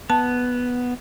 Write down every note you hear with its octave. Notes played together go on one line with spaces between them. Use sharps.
B3 A5